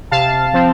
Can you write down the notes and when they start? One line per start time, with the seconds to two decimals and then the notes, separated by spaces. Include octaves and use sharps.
0.11 C3 F5 A5
0.53 F3 C4